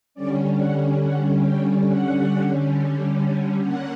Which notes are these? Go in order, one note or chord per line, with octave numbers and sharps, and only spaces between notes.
D3 G3 C#4 D5
F#5
F#5
G5
F#5
D3 A#3 C#4 F#5